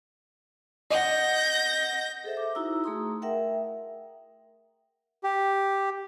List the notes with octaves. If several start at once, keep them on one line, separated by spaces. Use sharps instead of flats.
D#5 F#5 G6 A#6
G#4 A4 C5 E5
D6
D#4 E4 F#4 A#5 E6
A3 G#4 A#5 C6 D#6
A#4 E5 F#5 G5
G4